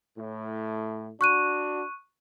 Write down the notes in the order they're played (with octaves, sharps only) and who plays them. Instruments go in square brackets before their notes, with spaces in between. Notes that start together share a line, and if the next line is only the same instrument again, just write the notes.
[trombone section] A2
[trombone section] D4 F#4 [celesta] C#6 F#6 D#7